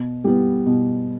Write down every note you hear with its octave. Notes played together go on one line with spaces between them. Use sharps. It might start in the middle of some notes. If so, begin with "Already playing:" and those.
Already playing: B2
G3 B3
B2